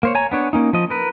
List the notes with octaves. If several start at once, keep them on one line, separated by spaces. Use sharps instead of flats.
A#3 C5 C#5
C#5 G#5 A#5
B3 D4 C#5
A#3 C#4 D#4
F3 D#5
A#4 B4